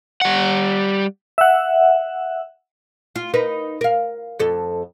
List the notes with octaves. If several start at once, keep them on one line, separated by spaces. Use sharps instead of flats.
G3 F#5
E5 F#5
F4
D#4 A#4 B4
A#4 F5
F2 A4